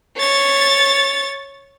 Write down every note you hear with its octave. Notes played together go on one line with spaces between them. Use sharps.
C#5 A6